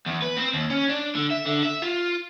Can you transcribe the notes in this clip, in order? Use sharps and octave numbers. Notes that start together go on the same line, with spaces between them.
E2
B4
C4
D#2
C#4
D4
D3
E5
D3
E5
F4